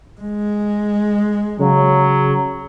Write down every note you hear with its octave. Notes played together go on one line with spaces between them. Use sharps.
G#3
C#3 F#3